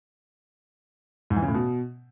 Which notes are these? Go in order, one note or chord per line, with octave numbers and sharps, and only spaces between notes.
G#2
E3
C#3
A2
B2